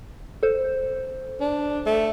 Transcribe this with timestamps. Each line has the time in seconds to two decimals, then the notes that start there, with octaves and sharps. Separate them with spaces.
0.43 A4 C5
1.40 D4
1.86 A3